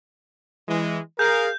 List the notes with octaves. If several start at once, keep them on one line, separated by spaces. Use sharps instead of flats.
E3 G#3
G#4 A#4 F5 G6